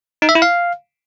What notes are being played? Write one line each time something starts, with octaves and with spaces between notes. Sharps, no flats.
D#4
E5
E4
F5